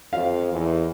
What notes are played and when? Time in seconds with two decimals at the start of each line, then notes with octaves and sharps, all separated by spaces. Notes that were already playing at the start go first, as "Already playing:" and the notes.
0.13 F2 F5
0.52 E2